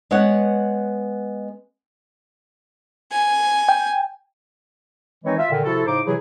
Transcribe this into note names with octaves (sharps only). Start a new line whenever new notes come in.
G#3 B3 B4 C#5 F#5
G#5
G5
D#3 E3 G#3 C4 D#4 C#5
F4 E5
A#2 D3 D#3
C3 F3 E4 F#4 A4
A2 C#3 D#4 C5 D6
C3 E3 F#3 E4 G#4